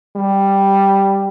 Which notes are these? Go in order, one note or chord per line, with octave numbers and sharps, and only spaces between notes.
G3